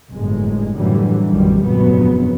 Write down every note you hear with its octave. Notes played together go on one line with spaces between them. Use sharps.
G1 F#2 A2 G#3
F#2 A2 D3 E3 F#3 G3
A1 F2 D#3 F#3 G3
F1 A#1 G2 C#3 F#3 B3